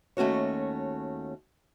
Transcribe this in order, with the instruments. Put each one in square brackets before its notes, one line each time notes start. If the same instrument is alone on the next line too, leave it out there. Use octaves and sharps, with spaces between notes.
[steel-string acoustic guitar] D#2 A3 C#4 F#4 C#5